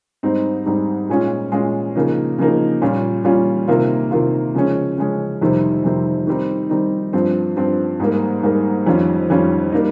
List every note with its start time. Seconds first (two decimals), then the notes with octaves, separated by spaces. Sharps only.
0.23 G#2 G3 C4 D#4
0.66 G#2 G3 C4 D#4
1.09 A#2 G#3 C#4 F4
1.52 A#2 G#3 C#4 F4
1.96 C#3 F3 A#3 D#4
2.38 C#3 F3 A#3 D#4
2.82 A#2 G3 C#4 F4
3.24 A#2 G3 C#4 F4
3.68 C3 D#3 A#3 F4
4.11 C3 D#3 A#3 F4
4.55 C#3 F3 G#3 C#4
4.98 C#3 F3 G#3 C#4
5.41 F2 C3 D#3 G3 C4
5.84 F2 C3 D#3 G3 C4
6.27 D#3 G3 C4 D#4
6.70 D#3 G3 C4 D#4
7.13 G2 F3 C4
7.57 G2 F3 C4
8.00 G#2 G3 A#3
8.43 G#2 G3 A#3
8.86 F2 D#3 G3 C#4 F4
9.30 F2 D#3 G3 C#4 F4
9.72 G3 A#3 D#4